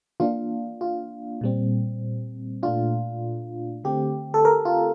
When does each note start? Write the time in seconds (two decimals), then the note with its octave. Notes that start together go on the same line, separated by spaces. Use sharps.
0.20 E3 A#3 D4 F4
0.81 F4
1.41 A#2 G3 C4
2.63 A#2 A3 D4 F4
3.84 D3 A3 C4 G4
4.34 A4
4.45 A#4
4.65 F4